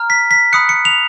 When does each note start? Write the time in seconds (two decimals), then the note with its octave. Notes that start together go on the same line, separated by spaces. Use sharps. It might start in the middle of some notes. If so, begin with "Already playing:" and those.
Already playing: A#5 F6
0.10 B6
0.31 B6
0.53 B5 D#6 F#6 C#7
0.69 C#7
0.85 F7